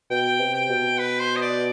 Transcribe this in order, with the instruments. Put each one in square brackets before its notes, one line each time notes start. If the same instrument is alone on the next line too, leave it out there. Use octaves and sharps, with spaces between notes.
[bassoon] B2 [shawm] G5
[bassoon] C3
[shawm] G5
[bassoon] B2
[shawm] B4
C5
D#5
D5